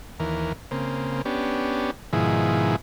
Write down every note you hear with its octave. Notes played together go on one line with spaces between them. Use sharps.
D#2 E3 A#4
C#3 A#3 C4
B3 C#4 D4 G4
G#2 B2 D#3 F3 E4 G#4